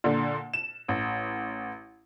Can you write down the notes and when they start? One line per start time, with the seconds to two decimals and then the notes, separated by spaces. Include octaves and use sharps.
0.04 A#2 D3
0.54 E7
0.88 A1